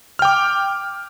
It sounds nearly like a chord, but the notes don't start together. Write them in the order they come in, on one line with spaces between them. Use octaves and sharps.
F6 G5 D6